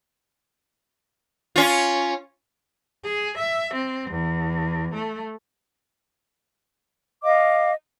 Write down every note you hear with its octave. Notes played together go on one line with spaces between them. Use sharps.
C#4 F4
G#4
E5
C4
E2
A3
D#5 F5 D6